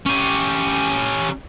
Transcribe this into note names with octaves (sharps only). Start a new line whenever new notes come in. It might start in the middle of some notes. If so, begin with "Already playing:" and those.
C#4 G4